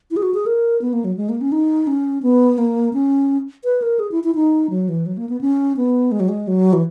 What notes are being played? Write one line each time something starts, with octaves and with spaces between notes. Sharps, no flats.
E4
G#4
F#4
G#4
A#4
B3
A#3
F#3
G#3
A#3
C#4
D#4
C#4
B3
A#3
C#4
B4
A#4
G#4
E4
E4
D#4
F#3
E3
F#3
A#3
B3
C#4
B3
G#3
F#3
G#3
F#3
E3